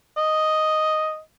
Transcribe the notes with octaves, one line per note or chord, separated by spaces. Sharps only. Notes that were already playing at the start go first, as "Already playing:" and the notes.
D#5